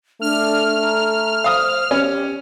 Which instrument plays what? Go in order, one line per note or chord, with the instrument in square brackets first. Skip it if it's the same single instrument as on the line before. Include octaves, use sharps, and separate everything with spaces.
[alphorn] A3 [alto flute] D4 [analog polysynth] F6
[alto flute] A#5
[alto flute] C5 [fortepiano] F5 D#6
[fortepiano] C#4 [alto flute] G4